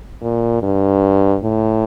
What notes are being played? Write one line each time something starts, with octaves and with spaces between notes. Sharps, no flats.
A#2
G2
A2